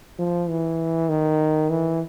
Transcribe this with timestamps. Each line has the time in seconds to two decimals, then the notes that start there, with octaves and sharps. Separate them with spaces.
0.19 F3
0.49 E3
1.09 D#3
1.70 E3